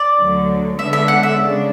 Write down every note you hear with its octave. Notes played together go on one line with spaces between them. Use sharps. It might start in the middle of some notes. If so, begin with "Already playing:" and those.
Already playing: D5
D2 D3 F#3
D3 G#3 B3 D4 E5
E5
F#5
E5
C#3 G#3 D4